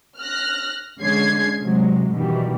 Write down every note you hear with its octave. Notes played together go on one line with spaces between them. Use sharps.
F6 F#6 A#6
D3 G#3 C#4 G#6 C7
C3 F#3 G#3
F#2 B2 D#3 E3 G3